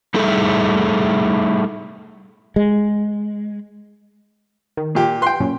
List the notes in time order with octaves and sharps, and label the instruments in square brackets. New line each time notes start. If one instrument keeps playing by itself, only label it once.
[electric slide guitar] G3 A3 D#4 E4 G#4 A4
[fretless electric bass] G#3
[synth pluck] D#3
[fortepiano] A#2 G4
[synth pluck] B4 [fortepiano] G5 C6
[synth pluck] F#2 A#2 C#4